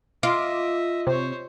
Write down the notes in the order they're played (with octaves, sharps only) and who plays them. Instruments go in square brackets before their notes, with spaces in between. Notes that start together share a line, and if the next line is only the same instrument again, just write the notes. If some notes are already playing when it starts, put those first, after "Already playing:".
[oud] F4 [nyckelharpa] D#5 E5 [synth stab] D6
[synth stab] C3 [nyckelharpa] C5 C#5